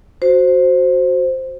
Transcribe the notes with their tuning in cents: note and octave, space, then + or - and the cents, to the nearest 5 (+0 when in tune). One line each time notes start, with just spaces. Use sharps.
F#4 +0 C5 +0